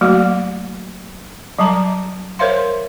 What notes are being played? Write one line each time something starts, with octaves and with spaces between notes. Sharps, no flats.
F#3 G3 A3 A#3 F#4
F#3 G3 A5 A#5
A#4 C5 C#5 E5 F5 C6